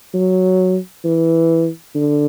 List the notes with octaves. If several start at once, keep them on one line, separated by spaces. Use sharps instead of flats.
F#3
E3
D3